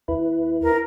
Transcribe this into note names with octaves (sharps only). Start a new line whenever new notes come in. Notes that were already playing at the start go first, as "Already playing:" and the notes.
D#2 E4 B4
A#4